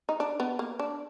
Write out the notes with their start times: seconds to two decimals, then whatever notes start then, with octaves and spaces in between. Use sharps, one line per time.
0.09 D#4
0.20 D4
0.40 B3
0.59 A#3
0.79 D4